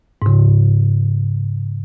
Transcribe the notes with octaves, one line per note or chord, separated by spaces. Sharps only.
G#2 C#3